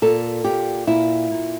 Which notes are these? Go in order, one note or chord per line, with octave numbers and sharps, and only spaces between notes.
A#2 A4
A#2 G4
A#2 E4
A#2